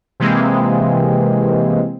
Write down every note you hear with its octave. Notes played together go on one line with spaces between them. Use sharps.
C3 E3 G#3 A#3 C4